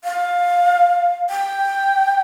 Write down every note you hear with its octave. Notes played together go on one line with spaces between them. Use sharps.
F5
G5